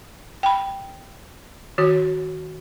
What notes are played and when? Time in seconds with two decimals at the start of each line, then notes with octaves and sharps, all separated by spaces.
0.43 G5 B5
1.78 D#3 F#4 C#5